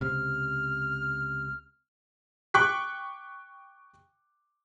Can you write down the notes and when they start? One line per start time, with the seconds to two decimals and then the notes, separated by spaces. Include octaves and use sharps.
0.01 C#2 C3 F6
2.54 G5 C#6 D6 F#6 B6